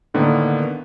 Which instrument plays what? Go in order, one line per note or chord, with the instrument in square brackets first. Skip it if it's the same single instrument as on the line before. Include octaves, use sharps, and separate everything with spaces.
[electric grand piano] A2 D3 D#3 A#3 B3